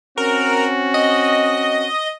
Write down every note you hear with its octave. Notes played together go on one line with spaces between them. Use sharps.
C4 C#4 F#4 A#4
D#5